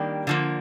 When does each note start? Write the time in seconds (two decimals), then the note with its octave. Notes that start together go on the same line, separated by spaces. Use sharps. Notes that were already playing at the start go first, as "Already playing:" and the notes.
Already playing: D#3 G3 A#3 D4
0.27 D3 F3 A#3